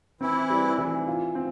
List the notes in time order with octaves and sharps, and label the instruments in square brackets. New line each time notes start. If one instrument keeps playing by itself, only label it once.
[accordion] E3 E4 [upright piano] C4
[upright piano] G3
E3
F4
C4